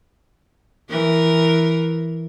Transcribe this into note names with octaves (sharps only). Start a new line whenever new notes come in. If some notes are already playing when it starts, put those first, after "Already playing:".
E3 A#4